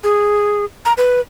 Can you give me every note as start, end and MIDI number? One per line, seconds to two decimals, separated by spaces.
0.04 0.65 68
0.85 0.93 82
0.98 1.21 71